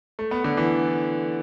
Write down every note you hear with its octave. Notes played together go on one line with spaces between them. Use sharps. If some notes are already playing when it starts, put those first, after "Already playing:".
A3
B3
D3
E3